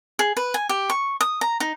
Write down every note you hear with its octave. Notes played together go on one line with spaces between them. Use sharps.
G#4
B4
G#5
G4
C#6
D#6
A#5
D#4